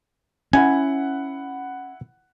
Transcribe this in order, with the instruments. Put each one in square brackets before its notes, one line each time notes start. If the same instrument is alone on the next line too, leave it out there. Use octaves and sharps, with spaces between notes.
[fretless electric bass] C#4 [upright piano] E4 F#5 B5 [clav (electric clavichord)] G#5